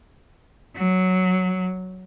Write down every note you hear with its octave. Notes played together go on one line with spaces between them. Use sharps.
F#3